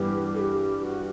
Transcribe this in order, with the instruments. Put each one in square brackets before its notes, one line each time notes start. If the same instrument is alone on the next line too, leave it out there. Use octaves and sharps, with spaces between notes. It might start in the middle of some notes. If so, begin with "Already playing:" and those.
Already playing: [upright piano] G2 E3 G3 B3 [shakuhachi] G4
[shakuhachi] A4
G4
G4
F#4